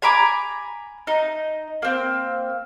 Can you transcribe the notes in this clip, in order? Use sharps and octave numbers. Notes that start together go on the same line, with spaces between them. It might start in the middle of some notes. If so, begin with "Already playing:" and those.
G#5 A#5 B5 D6
D#4
A#3 C4